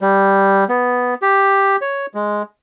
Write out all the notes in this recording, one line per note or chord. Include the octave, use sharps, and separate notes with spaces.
G3
B3
G4
C#5
G#3